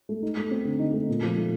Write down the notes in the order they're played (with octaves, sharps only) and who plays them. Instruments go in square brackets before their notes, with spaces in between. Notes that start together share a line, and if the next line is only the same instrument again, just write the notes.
[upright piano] A3
D#4
A3
C4
D3
D#4
A3
A#2
F3
A3